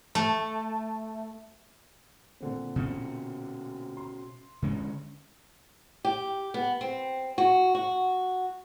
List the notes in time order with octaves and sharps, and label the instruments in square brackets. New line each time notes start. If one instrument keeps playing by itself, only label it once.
[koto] A3
[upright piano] A#2 D3 C4
[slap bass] B2 C#4
[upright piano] C6
[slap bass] D3 G#3 C#4
[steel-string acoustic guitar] G4
B3
C4
F#4
F#4